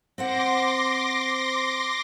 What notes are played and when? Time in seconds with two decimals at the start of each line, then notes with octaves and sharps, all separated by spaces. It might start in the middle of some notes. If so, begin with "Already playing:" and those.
0.18 C4 C5 F#5 C6 D6 A#6